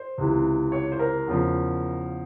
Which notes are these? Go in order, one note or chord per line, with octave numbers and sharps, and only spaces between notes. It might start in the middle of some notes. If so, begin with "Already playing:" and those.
Already playing: C5
C#2 C3 E3
C#5
C5
A#4
E2 C#3 F3